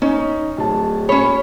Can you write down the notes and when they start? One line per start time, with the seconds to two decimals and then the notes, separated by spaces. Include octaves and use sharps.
0.02 C#4 D#4
0.57 D1 A5
1.09 C#4 C#5 B5